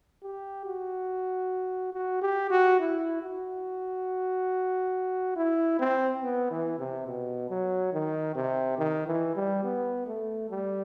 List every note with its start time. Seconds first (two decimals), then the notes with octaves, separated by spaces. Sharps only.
0.23 G4
0.66 F#4
1.93 F#4
2.22 G4
2.51 F#4
2.80 E4
3.23 F#4
5.36 E4
5.79 C4
6.22 B3
6.51 E3
6.79 C3
7.07 B2
7.50 F#3
7.93 D#3
8.35 C3
8.78 D#3
9.07 E3
9.36 G3
9.64 B3
10.07 A3
10.50 G3